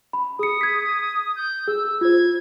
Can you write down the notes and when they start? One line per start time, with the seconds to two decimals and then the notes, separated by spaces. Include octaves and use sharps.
0.13 B5
0.39 G#4 D#6 C#7
0.61 G#6 B6
1.36 G6
1.68 G#4 E6
2.01 F4 C5 G#6